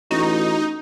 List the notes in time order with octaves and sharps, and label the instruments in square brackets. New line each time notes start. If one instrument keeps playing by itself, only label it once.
[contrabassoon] A1 [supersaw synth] D#4 [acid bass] F#4